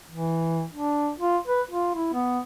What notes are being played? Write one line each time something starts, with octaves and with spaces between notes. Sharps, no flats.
E3
D4
F4
B4
F4
E4
B3